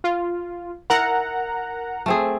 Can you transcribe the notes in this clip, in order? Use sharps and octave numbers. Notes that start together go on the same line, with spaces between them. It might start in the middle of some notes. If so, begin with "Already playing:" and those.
F4
E4 A#4 F#5 A#5
A3 C4 G#4